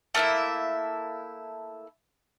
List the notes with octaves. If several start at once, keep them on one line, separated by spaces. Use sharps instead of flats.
A3 A#3 E4 E5